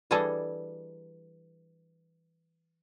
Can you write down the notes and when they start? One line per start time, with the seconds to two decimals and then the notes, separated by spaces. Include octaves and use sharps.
0.11 E3 G3 D4 G#4 A4 D#5